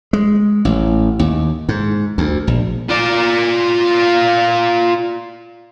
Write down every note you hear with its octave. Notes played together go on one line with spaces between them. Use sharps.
G#3
A1
D#2
G#2
D2
A#1
F4 D5